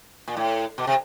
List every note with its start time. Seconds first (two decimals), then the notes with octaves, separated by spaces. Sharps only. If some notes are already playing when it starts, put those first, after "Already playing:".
0.28 A#2
0.37 A2
0.78 B2
0.87 C3